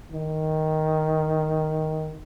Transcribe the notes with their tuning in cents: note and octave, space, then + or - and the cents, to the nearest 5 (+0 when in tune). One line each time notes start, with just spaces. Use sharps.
D#3 +5